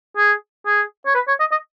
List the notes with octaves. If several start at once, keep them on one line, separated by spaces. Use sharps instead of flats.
G#4
G#4
C#5
B4
C#5
D#5
D#5